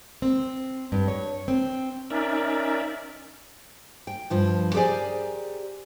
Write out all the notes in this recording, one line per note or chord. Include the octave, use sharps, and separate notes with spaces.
C4
G2
C#5
C4
C#4 D#4 A#4 D5 E5
G5
G2 F3 F4
G4 G#4 A#4 C5 D5 G#5